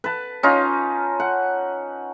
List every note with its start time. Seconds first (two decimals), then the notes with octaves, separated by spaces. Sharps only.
0.04 B4 A5
0.43 C#4 D#4 F4
1.20 F#5